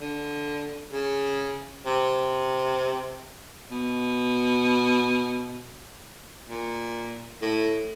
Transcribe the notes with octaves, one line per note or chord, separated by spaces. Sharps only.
D3
C#3
C3
B2
A#2
A2